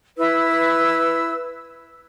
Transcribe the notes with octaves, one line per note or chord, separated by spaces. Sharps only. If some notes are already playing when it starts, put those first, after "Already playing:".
E4 B4 E6